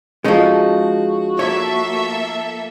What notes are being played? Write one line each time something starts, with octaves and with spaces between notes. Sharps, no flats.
F3 G#3 C#4 D#4 F#4 A4
A#3 A4 C#5 E5